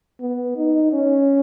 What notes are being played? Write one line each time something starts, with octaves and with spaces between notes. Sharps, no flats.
B3
D#4
C#4